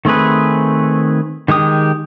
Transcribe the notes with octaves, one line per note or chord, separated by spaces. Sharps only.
D#3 A3 C4 G#4 B4
D#3 G#3 G4 D#6